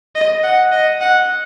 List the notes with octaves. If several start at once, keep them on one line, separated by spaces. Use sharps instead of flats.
D#5
F#5
D#5
F#5